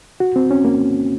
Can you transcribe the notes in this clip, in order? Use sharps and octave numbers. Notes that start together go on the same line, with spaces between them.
F#4
C4
C#4
A#3